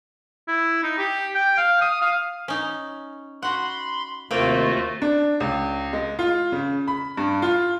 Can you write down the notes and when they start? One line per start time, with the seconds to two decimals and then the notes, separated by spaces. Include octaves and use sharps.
0.48 E4
0.83 D#4
0.98 G4
1.35 G5
1.57 F5
1.81 D#6
2.01 F5
2.48 C#4 D#4
3.42 F#4 F#5 B5 C6
4.31 D#2 C3 A3 A#3 C4 F4 F#4 G5
5.02 D4
5.40 C#2
5.93 G#3
6.19 F4
6.52 C#3
6.88 B5
7.17 G2
7.42 F4